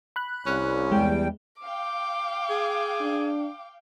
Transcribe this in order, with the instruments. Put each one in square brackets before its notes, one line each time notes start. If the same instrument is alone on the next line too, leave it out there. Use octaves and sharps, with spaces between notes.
[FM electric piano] B5 F#6
[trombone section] C2 [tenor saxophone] C#4
[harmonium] E2 G3 G5 [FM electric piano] G#3
[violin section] F5 G5 [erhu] D6
[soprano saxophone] G#4
[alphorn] D4